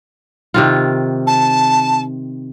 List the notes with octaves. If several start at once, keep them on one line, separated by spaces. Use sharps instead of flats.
C3 D#3 F4
A5